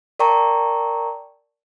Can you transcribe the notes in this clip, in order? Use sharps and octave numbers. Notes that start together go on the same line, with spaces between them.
A#4 D5 G5 A5 A#5 C#6